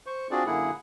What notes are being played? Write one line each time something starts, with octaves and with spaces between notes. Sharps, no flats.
C5 C#6
C4 D4 F4 F#4 G#4 D5
F#2 D3 A#3 E4 G#4 F#5